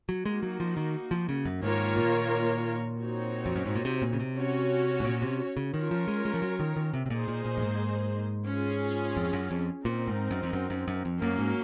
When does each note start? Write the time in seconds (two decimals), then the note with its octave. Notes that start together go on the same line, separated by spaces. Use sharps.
0.09 F#3
0.25 G#3 A#3 D#4 F#4
0.43 F#3
0.60 F3
0.77 D#3
1.11 F3
1.29 C#3
1.45 F#2
1.62 G#2 D#3 A#3 F4 A#4 C#5
1.97 A#2
2.99 C4 D#4 F#4 C#5
3.46 F2
3.56 F#2
3.66 G#2
3.76 A#2
3.85 C3
4.02 A#2
4.13 C#3
4.20 C3
4.37 C#4 F#4 C#5
5.00 G#2
5.05 A#2
5.22 C3
5.57 C#3
5.73 D#3 C#4 F4 A#4 C#5
5.91 F3
6.08 G#3
6.25 G#3
6.34 F3
6.42 F#3
6.60 D#3
6.76 D#3
6.94 C3
7.06 C3
7.10 A#2 A#3 D#4 G#4 C5
7.28 A#2
7.45 A#2
7.57 F#2
7.62 G#2
8.48 C#4 F4 G#4
9.17 F2
9.33 F#2
9.51 F2
9.85 A#2 C4 D#4 A#4
10.08 G#2
10.31 F#2
10.43 F2
10.53 F#2
10.70 F#2
10.88 F#2
11.05 F2
11.22 F#2 F#3 A#3 C#4
11.39 G#2